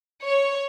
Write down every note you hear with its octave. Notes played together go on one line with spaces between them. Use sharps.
C#5